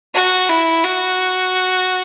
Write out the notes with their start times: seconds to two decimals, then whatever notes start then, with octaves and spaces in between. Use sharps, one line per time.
0.14 F#4
0.49 E4
0.84 F#4